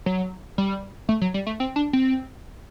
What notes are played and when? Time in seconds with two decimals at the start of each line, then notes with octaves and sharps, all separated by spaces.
0.06 F#3
0.58 G3
1.09 A3
1.21 F#3
1.34 G3
1.47 A3
1.60 C4
1.76 D4
1.93 C4